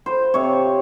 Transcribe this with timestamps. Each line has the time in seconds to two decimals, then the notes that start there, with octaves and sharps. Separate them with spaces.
0.06 C5
0.34 C3 C#5